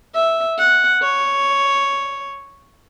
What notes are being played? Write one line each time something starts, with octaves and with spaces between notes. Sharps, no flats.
E5
F#5
C#5